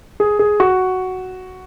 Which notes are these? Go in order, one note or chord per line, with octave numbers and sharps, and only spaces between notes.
G#4
G#4
F#4